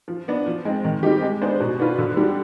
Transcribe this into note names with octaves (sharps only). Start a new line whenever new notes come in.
F3
B3 D4
F3
G#3 C4
D#3
G3 C4 D#4 G4
G#3
B3 D4 G#4 C5
B2
B3 D4 F4 B4
D3
G3 D4